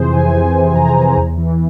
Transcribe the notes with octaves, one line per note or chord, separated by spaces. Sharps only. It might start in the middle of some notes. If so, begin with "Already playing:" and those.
Already playing: F2 C3 E3 G#4 C5
C3 E3 G#5
F2 G#5
C3 E3
G#5
F2 A#5
C3 E3
E2
E3